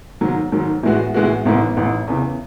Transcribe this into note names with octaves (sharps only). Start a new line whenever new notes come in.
G#2 D#3 F#3
G#2 D#3 F#3
A2 E3 G#3 B3 F#4
A2 E3 G#3 B3 F#4
A1 G#2 E3 B3
A1 G#2 E3 B3
E2 C#3 E3